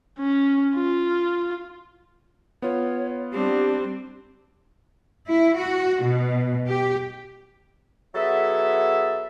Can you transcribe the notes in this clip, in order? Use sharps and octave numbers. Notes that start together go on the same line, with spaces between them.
C#4
F4
B3 F4 C#5
G3 C4 D4 G4
E4
F#4
B2
G4
F#3 B3 G#4 A4 E5